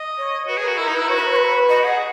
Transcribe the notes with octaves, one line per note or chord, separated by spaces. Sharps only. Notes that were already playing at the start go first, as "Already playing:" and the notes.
Already playing: D#5
C#5
F#4 B4
G#4
A#4
F#4
E4 A#4
D#4
B4
E4
F#4 C#5
B4
A#4
C#5
B4
F#4 D#5
G#4 F#5